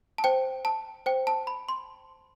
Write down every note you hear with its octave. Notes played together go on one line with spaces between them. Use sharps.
A5
C5 G5
A5
C5 G5
A5
B5
C6